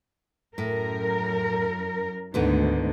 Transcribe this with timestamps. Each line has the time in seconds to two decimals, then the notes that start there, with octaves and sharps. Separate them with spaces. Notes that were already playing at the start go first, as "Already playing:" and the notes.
0.58 F#2 A2 A#4
2.34 D2 G#2 D3 D#3 B3